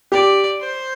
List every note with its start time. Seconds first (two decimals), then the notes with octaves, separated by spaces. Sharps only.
0.12 G4 D5
0.60 C5